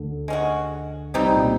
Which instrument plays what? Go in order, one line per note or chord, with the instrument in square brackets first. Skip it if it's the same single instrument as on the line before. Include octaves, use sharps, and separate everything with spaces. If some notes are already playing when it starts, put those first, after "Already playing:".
Already playing: [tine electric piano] D2 D3
[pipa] G#3 C#4 F#4
[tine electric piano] C2 C3 [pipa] G3 C4 D#4 G4
[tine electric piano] A#2
B2